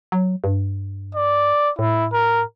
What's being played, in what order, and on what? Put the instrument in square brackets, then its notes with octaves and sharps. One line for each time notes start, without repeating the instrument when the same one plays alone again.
[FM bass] F#3
G2
[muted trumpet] D5
[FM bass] A2 [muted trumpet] E4
[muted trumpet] A#4